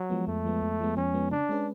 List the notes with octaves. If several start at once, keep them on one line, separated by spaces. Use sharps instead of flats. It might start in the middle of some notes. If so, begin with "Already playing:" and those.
Already playing: F#3
F3 G#3 B3
F2 A3
F3 G#3 B3
F2
F3 G#3 B3
F2 C#4
F3 G#3 B3
C#3 D4
G#3 C#4 G#4 B4